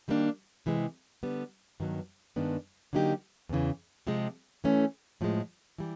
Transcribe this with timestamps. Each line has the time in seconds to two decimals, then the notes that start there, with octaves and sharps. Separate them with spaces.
0.08 D#3 G3 A#3 D4
0.66 C3 E3 G#3
1.23 D3 G3 B3
1.80 G2 D#3 F#3 B3
2.36 G2 D#3 G#3 B3 D4
2.93 D3 F#3 A#3 D#4 G4
3.49 E2 C#3 E3
4.07 C3 F3 G#3
4.64 E3 A3 C#4
5.21 A2 F3 G#3
5.78 E3 G3